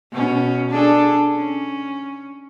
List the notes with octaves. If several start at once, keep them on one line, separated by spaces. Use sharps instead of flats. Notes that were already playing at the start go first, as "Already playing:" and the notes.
B2 C#4
D4 G#4 A4
C#4